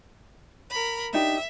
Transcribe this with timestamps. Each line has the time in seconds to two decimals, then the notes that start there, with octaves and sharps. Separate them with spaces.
0.71 A#4 B5
1.13 D4 D#4 G4 E5